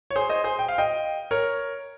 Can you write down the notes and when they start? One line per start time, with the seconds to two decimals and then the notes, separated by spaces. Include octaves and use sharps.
0.10 C#5
0.16 G#4 C5
0.29 C5 D#5
0.44 G#4 C5
0.59 G5
0.68 F5
0.78 D#5 G5
1.31 A#4 C#5